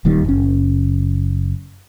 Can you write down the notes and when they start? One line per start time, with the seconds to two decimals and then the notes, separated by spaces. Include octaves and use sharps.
0.05 D#1 D#2 D#3 G3
0.25 F#1 C#4